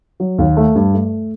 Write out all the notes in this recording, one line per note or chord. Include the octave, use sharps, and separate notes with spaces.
F#3
D#2
A3
G2
A3